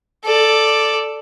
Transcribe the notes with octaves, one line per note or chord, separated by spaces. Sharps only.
A4 D5